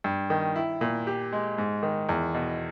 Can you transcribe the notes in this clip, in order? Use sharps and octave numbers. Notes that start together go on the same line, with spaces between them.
G2
D#3
E4
A#2
G4
G#3
G#2
D#3
E2
B2